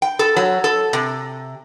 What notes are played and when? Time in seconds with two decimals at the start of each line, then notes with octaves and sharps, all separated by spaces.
0.02 G5
0.19 A4
0.37 F#3
0.64 A4
0.93 C3